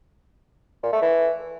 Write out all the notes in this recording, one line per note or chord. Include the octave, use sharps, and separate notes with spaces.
A#2
A3
E3